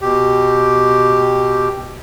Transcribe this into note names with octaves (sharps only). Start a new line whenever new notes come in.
B2 G4